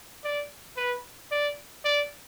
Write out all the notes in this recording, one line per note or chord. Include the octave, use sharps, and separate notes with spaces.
D5
B4
D5
D5